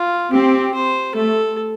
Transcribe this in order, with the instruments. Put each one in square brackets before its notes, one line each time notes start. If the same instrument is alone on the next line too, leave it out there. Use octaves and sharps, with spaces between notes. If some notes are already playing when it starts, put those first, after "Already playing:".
Already playing: [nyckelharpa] F4
[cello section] C4 [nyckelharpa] G4
[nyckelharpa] C5
[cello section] A3 [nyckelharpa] A4